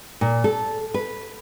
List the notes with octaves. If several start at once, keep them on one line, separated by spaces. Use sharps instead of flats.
A#2
A4
B4